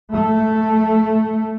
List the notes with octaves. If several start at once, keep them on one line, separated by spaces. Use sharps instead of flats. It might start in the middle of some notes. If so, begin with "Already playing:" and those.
A3